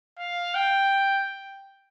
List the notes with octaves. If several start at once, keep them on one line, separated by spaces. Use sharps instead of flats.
F5
G5